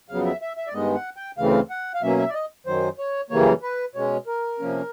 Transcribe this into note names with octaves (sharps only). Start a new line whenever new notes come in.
F2 C#3 F#3 B3 F5
E5
E5
E5
D5
G2 D#3 G#3 B3 D#5
F#5
G5
D2 C#3 E3 A3 C4 F5
F#5
F5
B2 F#3 A#3 C#4 E5
E5
D5
D#5
F#2 D#3 F#3 C5
C#5
F#2 C#3 E3 G3 A#3 C#5
B4
B2 G#3 C#4 C#5
A#4
C3 F3 A#3 C#4